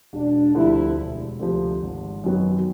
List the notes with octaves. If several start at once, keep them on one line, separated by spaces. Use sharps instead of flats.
E1 D4
D2 C3 F3 E4
E1
D2 C3 F3
G#1
F#2 D#3 F#3 B3